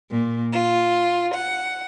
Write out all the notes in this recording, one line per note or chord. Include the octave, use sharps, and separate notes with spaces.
A#2
F4
F#5